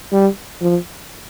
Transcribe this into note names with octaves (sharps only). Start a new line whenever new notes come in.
G3
F3